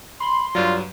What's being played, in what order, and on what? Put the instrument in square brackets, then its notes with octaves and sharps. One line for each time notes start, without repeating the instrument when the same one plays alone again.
[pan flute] B5 [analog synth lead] C6
[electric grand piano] G2 F#3 [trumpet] F4 [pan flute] D5